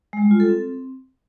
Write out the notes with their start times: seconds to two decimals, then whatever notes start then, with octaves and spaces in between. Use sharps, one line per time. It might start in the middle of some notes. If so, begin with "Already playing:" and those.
0.13 G#3
0.22 G3
0.31 F4
0.40 A4
0.49 C4